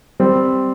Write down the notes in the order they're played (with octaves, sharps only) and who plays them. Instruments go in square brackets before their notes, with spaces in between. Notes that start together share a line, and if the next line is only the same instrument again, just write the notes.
[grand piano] G3 C4